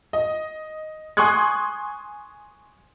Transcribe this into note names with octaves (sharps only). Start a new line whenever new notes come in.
D#5
G#5 C6 C#6 D#6 F#6 G#6